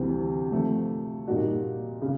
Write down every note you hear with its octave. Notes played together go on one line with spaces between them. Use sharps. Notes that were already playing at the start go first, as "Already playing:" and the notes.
Already playing: D2 C3 E3 G3 C4
C3 F3 A3
A#2 G3 A#3 D#4 F#4
C#3